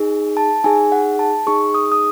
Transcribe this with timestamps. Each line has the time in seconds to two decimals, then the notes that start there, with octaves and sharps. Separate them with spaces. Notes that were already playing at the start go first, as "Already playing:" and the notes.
Already playing: D#4 G#4
0.37 A5
0.64 D#4 G#4 G#5
0.92 F#5
1.19 A5
1.47 D#4 G#4 C#6
1.74 D#6
1.92 D#6